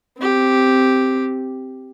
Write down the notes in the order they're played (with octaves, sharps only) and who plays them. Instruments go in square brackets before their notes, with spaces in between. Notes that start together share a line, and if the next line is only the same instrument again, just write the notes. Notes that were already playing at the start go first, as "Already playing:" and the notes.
[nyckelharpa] C4 G4